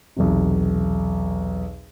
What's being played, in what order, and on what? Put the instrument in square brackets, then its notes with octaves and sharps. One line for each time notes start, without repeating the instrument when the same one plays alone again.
[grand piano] B1 E2 C3